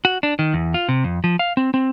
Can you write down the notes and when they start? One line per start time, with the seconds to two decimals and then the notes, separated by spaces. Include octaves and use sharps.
0.05 F#4
0.23 D4
0.39 D#3
0.54 E2
0.74 F4
0.89 C3
1.04 F2
1.24 F3
1.39 F5
1.57 C4
1.74 C4